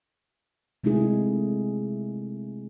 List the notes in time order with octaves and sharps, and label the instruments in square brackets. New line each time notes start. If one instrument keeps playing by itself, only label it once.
[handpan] C3 G#3 A3 D#4 E4 G#4